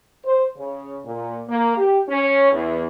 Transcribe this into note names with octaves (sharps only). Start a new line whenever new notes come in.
C5
C#3
A#2
A#3
G4
C#4
E2